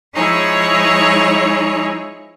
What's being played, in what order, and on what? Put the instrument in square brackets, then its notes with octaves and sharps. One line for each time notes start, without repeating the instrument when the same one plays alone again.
[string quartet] F3 G#3 D#4 E4 G#4 C#5